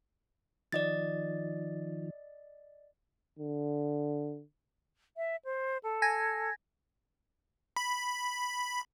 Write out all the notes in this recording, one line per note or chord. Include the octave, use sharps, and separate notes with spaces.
D#3 F3 D5 D#5 A6
D3
E5
C5
A4
G#5 G#6 A#6
B5